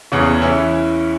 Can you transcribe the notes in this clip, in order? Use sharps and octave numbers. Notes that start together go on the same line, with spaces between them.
E2 C#3 E3 C#4
E3 C#4 E4